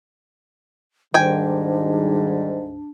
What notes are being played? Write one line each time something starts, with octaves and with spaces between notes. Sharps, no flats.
D2 G#2 D#3 G3 D4 G5 G#5